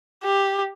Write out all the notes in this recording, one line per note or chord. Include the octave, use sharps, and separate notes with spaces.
G4